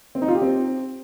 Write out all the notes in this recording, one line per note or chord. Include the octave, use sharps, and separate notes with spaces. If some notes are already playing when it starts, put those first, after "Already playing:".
C4
D#4
F4
G4
C4